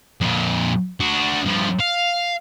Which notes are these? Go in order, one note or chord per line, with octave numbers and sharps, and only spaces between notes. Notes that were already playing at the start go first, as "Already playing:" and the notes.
F2 A#2
D4 F#4
G2 F3
F5